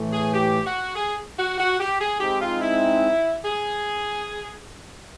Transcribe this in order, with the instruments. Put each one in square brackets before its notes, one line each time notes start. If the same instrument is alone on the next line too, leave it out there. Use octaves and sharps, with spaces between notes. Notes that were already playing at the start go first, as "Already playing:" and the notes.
Already playing: [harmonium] A2 E3 A3
[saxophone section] G#4
G4
F#4
G#4
F#4
F#4
G4
G#4
[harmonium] G#3 C4 D#4 [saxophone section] G4
[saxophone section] F4
E4
G#4